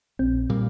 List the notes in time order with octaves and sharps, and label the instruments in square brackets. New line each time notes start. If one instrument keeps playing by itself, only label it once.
[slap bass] A#1 [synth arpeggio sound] C4
[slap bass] A#2 G3 A#3